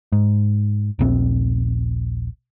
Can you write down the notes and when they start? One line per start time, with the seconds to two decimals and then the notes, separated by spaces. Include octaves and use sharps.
0.12 G#2
0.99 D#1 A#1 C4